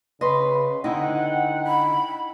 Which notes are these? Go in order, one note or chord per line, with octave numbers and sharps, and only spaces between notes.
C#3 B4 D#5 C6 B6
D3 D#4 E4 D#5 F#5 G5
B5